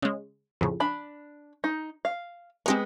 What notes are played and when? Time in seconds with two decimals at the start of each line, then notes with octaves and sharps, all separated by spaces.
0.02 C#3 G#3
0.61 F2 A2 C#3
0.80 D4 B5
1.64 D#4
2.05 F5
2.66 G#3 B3 C4 G4 A#4